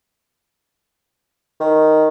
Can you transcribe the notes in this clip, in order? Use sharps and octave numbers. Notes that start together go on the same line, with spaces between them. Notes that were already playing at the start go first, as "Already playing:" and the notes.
D#3